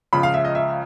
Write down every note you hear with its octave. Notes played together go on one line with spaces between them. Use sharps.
C#2 C#3 F3 B5
F5
E5
D#5
E5